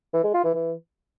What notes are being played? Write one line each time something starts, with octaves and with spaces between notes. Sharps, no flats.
E3
G#3
F4
E3
E3